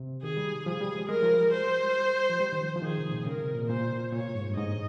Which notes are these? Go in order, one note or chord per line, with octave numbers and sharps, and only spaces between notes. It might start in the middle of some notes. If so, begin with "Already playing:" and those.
Already playing: C3
D#3 G#4
G3
F3 G#4
G3
G#3
G#3 A#4
F3
G3
C5
F3
G3
D#3
F3
F3
D#3 G#4
C3
A#2
C#3 A#4
C3
A#2
A#2 C5
A#2 C#5
G#2
G2
G#2 D#5